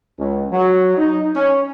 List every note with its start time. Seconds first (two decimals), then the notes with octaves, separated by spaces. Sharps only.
0.18 C#2
0.51 F#3
0.97 D#4
1.35 C#4